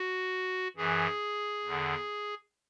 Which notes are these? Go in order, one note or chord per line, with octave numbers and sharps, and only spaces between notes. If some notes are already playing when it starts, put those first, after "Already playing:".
Already playing: F#4
F#2 E3 G#4
E2 D3